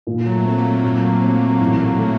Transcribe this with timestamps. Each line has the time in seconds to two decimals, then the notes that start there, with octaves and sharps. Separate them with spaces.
0.07 A#2
0.26 F#3
0.32 A3
0.45 A3 C4
0.58 A#3
0.83 A#2
1.21 C4
1.60 A1
1.98 A3